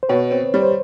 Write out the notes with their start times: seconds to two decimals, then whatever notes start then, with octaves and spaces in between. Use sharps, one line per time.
0.03 C5
0.09 B2 B4 C#5
0.31 C4
0.54 G3 C#5
0.62 C5